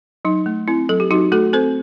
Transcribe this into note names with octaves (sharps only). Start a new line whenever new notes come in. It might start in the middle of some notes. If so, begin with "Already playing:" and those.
F#3 D#4
A3
C4 E4
F#3 A4
G4
F#3 D#4 F#4
A3 F#4 A4
C4 A4 C5